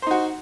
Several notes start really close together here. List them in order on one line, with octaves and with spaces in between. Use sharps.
C5 D#4 F#4